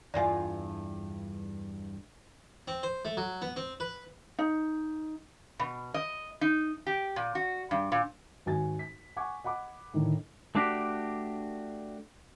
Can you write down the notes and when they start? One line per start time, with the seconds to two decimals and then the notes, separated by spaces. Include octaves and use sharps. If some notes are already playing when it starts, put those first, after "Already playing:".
0.14 E2 G2 F4 D5 G#5
2.68 C4
2.83 C5
3.05 A3
3.17 F#3
3.42 B3
3.56 C4
3.80 B4
4.39 D#4
5.60 B2
5.94 D#5
6.41 D#4
6.87 G4
7.16 A#2
7.35 F#4
7.71 G2
7.92 A#2
8.46 G#1 F#4 G#5 A6
8.79 B6
9.16 F#5 G#5 C#6 D6 G#6
9.44 D#5 F#5 B5 D6
9.93 A2 D3 D#3 A3
10.55 A3 D4 F#4 G4